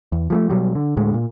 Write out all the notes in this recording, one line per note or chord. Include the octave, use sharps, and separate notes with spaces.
E2
F3 G#3 A3
B2 F#3 G3
D3
D2 A2 G#3
A#2